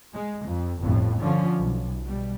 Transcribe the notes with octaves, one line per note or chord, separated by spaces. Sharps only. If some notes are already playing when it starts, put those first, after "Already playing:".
G#3
F2
G1 F2 A2
D3 F3 C#4
B1
B2 G3